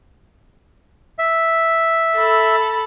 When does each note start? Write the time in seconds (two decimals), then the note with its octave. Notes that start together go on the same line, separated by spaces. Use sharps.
1.19 E5
2.16 A4 B5